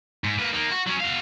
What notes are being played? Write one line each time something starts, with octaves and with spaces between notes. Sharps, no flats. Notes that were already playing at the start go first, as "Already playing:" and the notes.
G#2
A#3 B4
A#3 D#4
F#4
F#3 C#4
F#4 F5